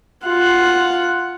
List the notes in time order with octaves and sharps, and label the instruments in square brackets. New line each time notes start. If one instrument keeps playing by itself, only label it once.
[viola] F4 F#5